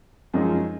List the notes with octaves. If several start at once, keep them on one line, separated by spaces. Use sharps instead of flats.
F#2 F3 G#3 D#4